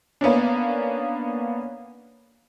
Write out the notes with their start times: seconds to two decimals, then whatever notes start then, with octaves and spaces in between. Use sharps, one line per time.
0.21 A#3 B3 C#4 D4